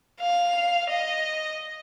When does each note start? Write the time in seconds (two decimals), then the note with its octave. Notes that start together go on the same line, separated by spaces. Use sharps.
0.21 F5
0.90 D#5